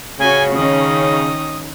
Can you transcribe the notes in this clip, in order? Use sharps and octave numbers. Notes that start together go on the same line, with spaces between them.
C#3 C#4 F#4 C#5 G#5
D#3 C#4 D#4 D#6